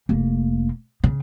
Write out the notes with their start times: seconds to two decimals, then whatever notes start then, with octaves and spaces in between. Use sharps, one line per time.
0.09 F1 A#3
1.04 C#3